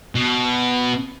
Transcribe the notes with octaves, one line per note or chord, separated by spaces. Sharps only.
B2